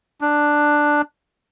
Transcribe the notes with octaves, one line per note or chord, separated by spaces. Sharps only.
D4